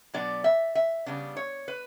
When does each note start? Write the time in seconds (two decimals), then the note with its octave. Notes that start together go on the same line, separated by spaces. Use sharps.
0.14 B2 F#3 B3 D4 D5
0.44 E5
0.75 E5
1.06 C#3 G3 B3 D4
1.37 C#5
1.68 B4